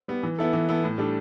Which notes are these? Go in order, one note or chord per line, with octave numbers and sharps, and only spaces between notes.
G3 B3
E3
B3 E4 A4
E3
B3 E4 A4
A2
G3 D4 A4